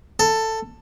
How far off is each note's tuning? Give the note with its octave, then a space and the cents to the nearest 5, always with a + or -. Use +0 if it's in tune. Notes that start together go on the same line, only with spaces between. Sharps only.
A4 +10